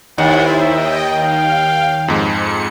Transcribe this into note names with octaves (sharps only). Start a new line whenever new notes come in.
D#2 D#4 E4 C5 F#5
D#5 E5 G5
F5 G5
F2 G#2 G#3 C#7